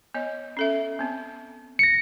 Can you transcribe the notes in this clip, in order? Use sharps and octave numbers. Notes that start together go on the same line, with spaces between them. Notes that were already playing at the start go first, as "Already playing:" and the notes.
B3 C#5 D#5
C#4 A4 E5
B3 C4
A#6 C#7